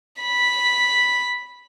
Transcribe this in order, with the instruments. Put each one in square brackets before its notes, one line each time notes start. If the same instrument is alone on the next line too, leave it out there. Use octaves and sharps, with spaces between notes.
[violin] B5 B6